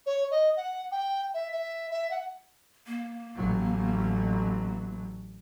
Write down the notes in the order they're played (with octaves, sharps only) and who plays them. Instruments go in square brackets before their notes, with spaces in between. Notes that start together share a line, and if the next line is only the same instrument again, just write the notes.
[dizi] C#5
D#5
F#5
G5
E5
E5
E5
F#5
[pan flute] A#3
[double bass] A1 F#3